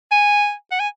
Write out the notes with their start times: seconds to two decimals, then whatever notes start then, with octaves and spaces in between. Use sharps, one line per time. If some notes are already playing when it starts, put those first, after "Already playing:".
0.11 G#5
0.71 F#5
0.79 G#5